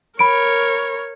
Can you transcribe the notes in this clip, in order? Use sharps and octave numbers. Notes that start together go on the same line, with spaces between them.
A#4 C#5 B5 D7